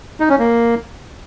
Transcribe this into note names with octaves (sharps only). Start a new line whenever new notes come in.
D#4
C#4
A#3